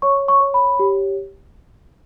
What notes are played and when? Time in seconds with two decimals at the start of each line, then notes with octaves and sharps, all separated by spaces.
0.02 C#5 C#6
0.28 C#6
0.40 C#5
0.54 B5
0.79 G4